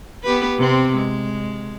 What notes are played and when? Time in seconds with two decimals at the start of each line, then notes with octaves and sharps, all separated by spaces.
0.24 B3 G4 B4
0.58 C3 C4
0.97 G#3